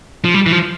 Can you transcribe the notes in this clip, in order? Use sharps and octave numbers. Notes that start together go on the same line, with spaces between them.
F3
G3
E3
F3